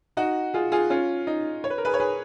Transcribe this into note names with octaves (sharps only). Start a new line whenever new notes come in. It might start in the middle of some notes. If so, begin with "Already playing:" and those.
D#4 F#4
F4 G#4
F4 G#4
C#4 F4
D#4
C#5
B4
A#4
G#4 B4
C#5
G#4 B4